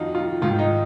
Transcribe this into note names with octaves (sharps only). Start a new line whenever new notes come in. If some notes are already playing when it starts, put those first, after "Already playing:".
Already playing: F2 D#3 D#4 F4 F#4
F4
G#2 D#3 F4
D#4